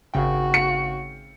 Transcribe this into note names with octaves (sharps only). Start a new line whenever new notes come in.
G#1 C#3 F#4 G5
C#7